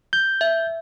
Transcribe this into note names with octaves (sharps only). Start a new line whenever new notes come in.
G6
E5